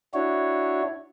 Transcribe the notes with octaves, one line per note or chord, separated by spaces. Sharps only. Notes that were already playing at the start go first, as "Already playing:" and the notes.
D4 E4 F#4 C#5